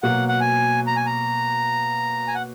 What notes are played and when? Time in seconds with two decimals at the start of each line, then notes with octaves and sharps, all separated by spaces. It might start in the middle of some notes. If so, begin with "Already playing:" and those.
0.03 B2 F#3 A#3 F#5
0.28 F#5
0.40 G#5
0.87 A#5
0.96 G#5
1.06 A#5
2.28 G#5
2.35 F#5